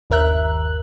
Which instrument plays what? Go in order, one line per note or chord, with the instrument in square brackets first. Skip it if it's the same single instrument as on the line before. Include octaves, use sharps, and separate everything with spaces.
[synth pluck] G1 D#2 A#4 E5 F#6